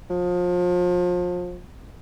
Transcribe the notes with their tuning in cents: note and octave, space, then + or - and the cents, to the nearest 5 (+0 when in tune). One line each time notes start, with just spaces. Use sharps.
F3 +30